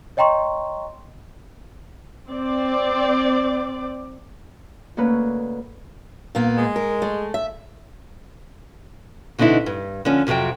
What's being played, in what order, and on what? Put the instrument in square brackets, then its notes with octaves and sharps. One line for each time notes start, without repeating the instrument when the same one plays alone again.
[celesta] C#5 D#5 G5 A#5 C6 C#6
[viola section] C4 D5
[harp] D2 A#3 C#4 B4
[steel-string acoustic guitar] A#2 A#3 B3
[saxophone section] G#3
[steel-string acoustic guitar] A#4
A3
E5
[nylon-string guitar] B2 D3 C4 D#4 E4
G2
D3 F3 C#4
F2 C3 F#3 C4 G5